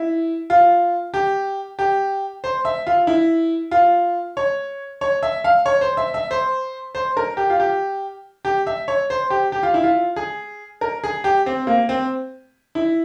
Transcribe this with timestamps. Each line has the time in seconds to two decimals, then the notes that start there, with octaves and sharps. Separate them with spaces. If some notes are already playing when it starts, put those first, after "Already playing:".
Already playing: E4
0.50 F4
1.14 G4
1.79 G4
2.44 C5
2.65 E5
2.87 F4
3.07 E4
3.71 F4
4.37 C#5
5.01 C#5
5.23 E5
5.44 F5
5.66 C#5
5.81 C5
5.97 E5
6.14 E5
6.31 C5
6.95 C5
7.17 A#4
7.37 G4
7.50 F4
7.60 G4
8.45 G4
8.67 E5
8.88 C#5
9.10 C5
9.30 G4
9.52 G4
9.63 F4
9.74 E4
9.83 F4
10.16 G#4
10.81 A#4
11.04 G#4
11.24 G4
11.46 C4
11.67 A#3
11.89 C4
12.75 E4